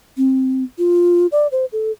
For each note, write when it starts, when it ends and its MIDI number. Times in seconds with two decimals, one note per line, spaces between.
0.17 0.64 60
0.78 1.27 65
1.32 1.47 74
1.52 1.65 72
1.73 1.92 69